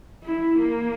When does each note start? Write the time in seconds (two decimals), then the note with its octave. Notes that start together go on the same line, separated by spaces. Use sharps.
0.24 E4
0.59 A#3